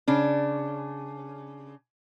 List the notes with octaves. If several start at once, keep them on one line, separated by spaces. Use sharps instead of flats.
C#3 D4